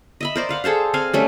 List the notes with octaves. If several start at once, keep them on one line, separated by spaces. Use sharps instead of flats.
D#5 E5 B5
A#4 C5 D5
B4 F5 F#5
G#4 A4 C5 F5
C4 F5 G#5
G3 A3 C#4